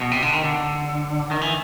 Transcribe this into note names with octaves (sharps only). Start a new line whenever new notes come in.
B2
C3
D3
D#3
D3
D#3
E3